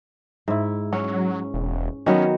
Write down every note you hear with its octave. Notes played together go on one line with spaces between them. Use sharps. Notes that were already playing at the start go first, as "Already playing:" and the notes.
G#2 E4
F#3 C#4
E1
D#3 F#3 B3 C#4